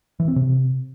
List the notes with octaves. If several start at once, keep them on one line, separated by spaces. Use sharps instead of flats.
E3
C4
C3